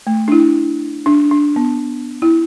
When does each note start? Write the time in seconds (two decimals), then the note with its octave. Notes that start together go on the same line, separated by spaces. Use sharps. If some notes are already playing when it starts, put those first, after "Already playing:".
0.07 A3
0.28 D4
0.32 E4
1.06 D4
1.31 D4
1.56 B3
2.22 E4